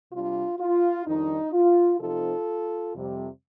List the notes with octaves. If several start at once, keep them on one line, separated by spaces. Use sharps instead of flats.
C3 G3 D4 F4
F4
F2 D#3 G3 D4 D#4
F4
C3 F3 C4 D#4 F4 A4
F2 C3 G3